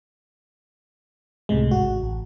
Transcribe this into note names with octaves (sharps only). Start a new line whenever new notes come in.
C#2 A2 C3 G#3
G#1 F#4
A1